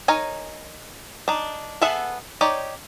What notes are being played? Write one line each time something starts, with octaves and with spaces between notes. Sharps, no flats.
D#4 A#4 C#5 G#5
D4 D#4
B3 G#4 A4 E5 F#5
D#4 G4 C#5 D5